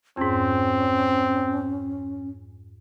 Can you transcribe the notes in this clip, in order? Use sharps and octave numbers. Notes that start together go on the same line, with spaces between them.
F2 G#2 C4 C#4